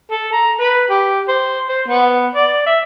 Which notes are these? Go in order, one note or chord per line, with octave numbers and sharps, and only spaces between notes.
A4
A#5
B4
G4
C5
C5
B3
D5
E5